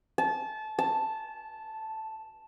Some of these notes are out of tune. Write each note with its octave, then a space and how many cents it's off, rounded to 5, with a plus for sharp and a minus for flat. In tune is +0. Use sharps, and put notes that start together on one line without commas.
A5 -25
A5 +0